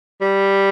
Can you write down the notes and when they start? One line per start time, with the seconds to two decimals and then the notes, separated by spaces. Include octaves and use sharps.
0.20 G3